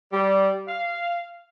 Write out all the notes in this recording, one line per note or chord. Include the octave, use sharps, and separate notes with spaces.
G3
F5